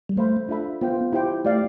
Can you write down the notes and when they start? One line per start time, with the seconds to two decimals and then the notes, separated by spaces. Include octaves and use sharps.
0.09 G3
0.17 A3 A4 C5 F5 B5
0.48 D4 F4 A4 E5 B5
0.81 B3 F4 C5 G5
1.12 E4 G4 C5 G5
1.44 A3 G4 D5 F5